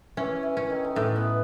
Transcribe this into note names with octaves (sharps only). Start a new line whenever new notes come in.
E3 C#4
E3
C#4
D#3
D#3
A2 E3
B3